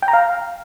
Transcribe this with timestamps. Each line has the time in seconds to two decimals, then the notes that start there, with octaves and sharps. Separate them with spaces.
0.02 G5
0.08 A#5
0.13 F5